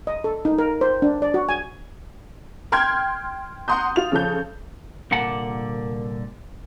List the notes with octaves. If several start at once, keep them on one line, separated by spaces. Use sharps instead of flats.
D#5
A4
D#4
A#4
C5
D4
D5
F#4
G#5
G5 C6 F6 G6 G#6
F#5 A#5 C6 D#6 G6
F4 F7
C#3 F3 A4 G6
C2 A#2 D3 A#3 F#5 A5